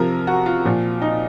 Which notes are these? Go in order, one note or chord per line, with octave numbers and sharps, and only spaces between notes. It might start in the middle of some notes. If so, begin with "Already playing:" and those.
Already playing: C3 F3 A#4
F#4
F4
A#2 F3
D#4